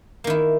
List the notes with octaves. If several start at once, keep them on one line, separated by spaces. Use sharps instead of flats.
D#3 A#3 E4